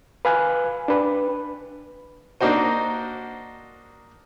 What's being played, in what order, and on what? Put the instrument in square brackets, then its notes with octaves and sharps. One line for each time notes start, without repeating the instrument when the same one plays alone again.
[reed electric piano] B4 F5 G#5 F#6
D4 B4
[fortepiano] A#3 D4 D#4 F#4 C5